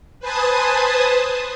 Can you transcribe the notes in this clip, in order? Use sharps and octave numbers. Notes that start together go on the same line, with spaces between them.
B4 C5 G#5 A5 D#6